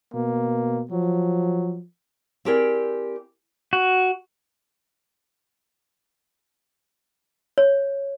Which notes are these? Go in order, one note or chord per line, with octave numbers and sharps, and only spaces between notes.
B2 A#3
F3 F#3
C4 E4 G4 G#4 A#4 D5
F#4
C#5